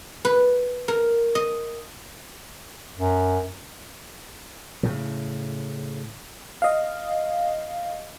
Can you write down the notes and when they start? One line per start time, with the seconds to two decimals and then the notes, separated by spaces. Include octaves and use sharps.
0.25 B4
0.88 A#4
1.35 D#5
2.97 F#2
4.83 A2 C#3
6.62 D#5 F5